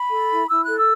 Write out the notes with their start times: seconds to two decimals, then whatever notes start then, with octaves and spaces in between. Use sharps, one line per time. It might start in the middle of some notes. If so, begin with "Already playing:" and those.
Already playing: B5
0.11 A4
0.29 E4
0.49 E4 E6
0.62 F#6
0.67 A4
0.77 E6